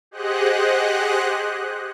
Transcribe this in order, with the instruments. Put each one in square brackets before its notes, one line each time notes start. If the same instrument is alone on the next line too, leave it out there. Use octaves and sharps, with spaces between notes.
[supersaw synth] G4 G#4 C5 D#5 F#5 F#6